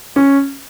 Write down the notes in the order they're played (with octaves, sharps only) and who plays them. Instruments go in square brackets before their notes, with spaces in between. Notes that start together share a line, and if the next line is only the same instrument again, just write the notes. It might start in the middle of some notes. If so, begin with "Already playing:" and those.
[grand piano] C#4